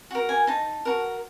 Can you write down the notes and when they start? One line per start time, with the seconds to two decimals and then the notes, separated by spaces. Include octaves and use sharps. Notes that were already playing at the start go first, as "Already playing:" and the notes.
0.11 F#4 A#4
0.29 G#5
0.47 D#4 A5
0.85 F#4 A#4